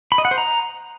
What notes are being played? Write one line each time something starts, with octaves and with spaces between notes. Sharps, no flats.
B5
D#5
F#5
C5
A#5